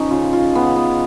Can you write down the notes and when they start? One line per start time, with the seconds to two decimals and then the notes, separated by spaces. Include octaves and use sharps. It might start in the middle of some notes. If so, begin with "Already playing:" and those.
Already playing: F3 G#3 C#4 D#4
0.11 C#3 F4
0.33 F4
0.55 C#3 B3
0.76 B3